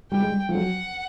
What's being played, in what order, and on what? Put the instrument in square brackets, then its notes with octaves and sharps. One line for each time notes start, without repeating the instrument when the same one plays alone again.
[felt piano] G3 [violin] G5
[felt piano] G#3
G3
F3
[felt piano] F#3 [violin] F#5